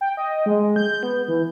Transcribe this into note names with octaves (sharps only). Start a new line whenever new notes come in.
G5
D#5
G#3
G6
B3
E3